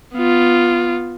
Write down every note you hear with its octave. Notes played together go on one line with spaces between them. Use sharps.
B3 F4